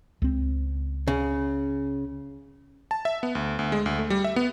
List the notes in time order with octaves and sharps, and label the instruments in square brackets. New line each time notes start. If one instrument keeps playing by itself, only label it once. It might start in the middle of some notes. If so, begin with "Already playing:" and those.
[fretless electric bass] C#2 C4
[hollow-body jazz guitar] C#3
[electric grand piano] A5
E5
B3
D2
D2
G#3
D2
A3
G3
E5
B3